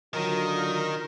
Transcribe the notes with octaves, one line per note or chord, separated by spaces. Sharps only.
D3 D#3 F#3 F4 A#4